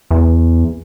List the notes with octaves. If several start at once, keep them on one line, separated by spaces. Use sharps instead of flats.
E2